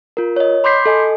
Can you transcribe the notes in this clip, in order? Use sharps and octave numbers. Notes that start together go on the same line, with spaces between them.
F4 A#4
C#5 D#5
B5 C6 D6 G6 B6 C7
A4 D#5 G#5